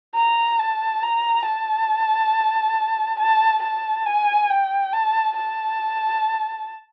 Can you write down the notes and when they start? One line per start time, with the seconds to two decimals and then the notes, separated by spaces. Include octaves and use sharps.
0.15 A#5
0.59 A5
1.02 A#5
1.45 A5
3.19 A5
3.62 A5
4.06 G#5
4.50 G5
4.93 A5
5.36 A5